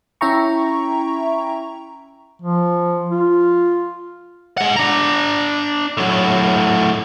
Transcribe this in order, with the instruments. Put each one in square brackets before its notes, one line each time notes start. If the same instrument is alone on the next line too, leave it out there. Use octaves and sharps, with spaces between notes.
[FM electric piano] C#4 E4 E5 G5 A#5 C#6
[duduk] F3
F4
[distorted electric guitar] G#3 F#5
D4 A#5
A2 F#3